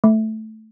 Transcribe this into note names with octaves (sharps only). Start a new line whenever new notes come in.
A3